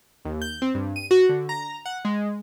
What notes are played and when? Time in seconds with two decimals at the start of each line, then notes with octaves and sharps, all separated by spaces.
0.25 D#2
0.42 G6
0.62 C4
0.74 G2
0.96 D#7
1.11 F#4
1.29 D3
1.49 A#5
1.86 F#5
2.05 G#3